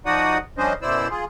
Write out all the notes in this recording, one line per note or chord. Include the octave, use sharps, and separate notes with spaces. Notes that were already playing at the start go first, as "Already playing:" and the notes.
F3 D#4 F#4 D5 F#5 D#6
F3 G3 C#4 D4 C5 D#5
F#2 B2 E4 C5 D5 E6
F4 G#4